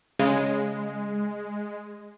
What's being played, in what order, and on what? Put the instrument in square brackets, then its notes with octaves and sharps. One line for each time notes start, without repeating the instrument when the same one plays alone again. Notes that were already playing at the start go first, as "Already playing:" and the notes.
[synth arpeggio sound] C#3 [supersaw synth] G#3